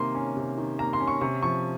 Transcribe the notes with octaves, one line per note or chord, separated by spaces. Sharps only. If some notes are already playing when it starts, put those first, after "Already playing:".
Already playing: C3 D#3 A#3 C6
C#4
C3
D#3
A#3 A#5
C6
C#4
C#6
C3 C#6
F3 C#6